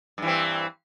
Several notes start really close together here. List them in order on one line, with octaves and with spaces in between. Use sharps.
G2 E3 C4